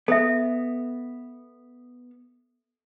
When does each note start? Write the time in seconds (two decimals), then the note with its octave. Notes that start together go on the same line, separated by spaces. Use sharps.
0.08 B3 A4 E5